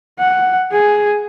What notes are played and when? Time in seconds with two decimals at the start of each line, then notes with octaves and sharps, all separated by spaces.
0.19 F#5
0.72 G#4